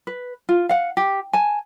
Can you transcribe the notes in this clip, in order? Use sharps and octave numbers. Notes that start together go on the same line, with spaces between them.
B4
F4
F5 F#5
G4
G#5 A5